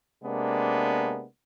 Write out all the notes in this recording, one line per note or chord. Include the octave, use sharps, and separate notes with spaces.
C3 G#3 A#3 B3 D4